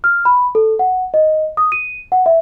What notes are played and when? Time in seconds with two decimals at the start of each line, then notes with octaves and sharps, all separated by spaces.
0.04 F6
0.25 B5
0.55 A4
0.79 F#5
1.14 D#5
1.57 D#6
1.72 D#7
2.12 F#5
2.26 E5